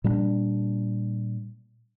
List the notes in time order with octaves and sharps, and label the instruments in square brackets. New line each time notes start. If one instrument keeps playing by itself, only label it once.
[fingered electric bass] A#2 G3 B3 D4